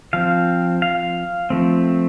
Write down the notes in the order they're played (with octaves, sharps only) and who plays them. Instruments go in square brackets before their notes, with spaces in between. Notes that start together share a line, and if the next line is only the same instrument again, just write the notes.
[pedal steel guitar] F3 C4 F5
F5
F3 A3 C4